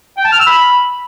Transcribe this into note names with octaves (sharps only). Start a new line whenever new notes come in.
G5
A5
F6
E6
B5